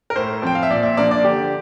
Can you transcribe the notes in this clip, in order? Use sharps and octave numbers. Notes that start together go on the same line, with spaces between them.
A#4
A2 C5
F3 C4 G5
F5
E5
A#2 D5
E5
F3 A#3 D4 D5
D5
D3 G4